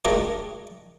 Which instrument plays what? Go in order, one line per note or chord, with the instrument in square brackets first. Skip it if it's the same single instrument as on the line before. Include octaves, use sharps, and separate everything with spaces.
[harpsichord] G#3 A3 D4 G4 A#4 D#5